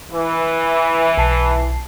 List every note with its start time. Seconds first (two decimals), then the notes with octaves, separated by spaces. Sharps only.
0.12 E3
1.17 B1 A5 C7